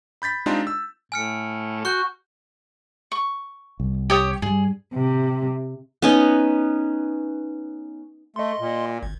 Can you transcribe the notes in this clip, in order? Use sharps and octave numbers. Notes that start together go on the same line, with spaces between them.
B5 G6 A6 B6
G#3 C4 D4 D#4 F4 G4
E6
A2 G#5 F6 C#7
F#4 C#6 F#6 G6
C#6
C2
G4 C#5 D#6
G2 G3 G#4
C3
B3 C#4 D#4
A3 D#5 C6
A#2
G#1